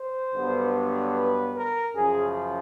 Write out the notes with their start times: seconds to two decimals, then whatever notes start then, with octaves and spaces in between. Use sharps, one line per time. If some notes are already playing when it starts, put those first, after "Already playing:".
Already playing: C5
0.34 G2 D3 F#3 B3
1.15 B4
1.56 A#4
1.96 F#2 C#3 F3 G#4